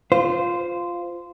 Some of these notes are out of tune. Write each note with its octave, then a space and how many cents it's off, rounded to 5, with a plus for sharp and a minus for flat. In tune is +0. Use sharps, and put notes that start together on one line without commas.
F4 +0 C5 -15